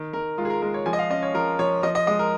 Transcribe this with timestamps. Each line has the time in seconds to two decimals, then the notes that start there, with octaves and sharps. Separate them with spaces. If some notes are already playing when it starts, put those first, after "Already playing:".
Already playing: D#3
0.13 D#3 A#4
0.38 G#3 F4
0.45 G#4
0.50 A#4
0.62 G#3 A#4
0.74 C#5
0.86 F3 G#5
0.93 D#5
0.99 F5
1.10 C#4 D#5
1.23 C#5
1.34 F3 A#4
1.59 F3 C#5
1.83 F3 D#5
1.95 D#5
2.07 G#3 D#5
2.19 A#4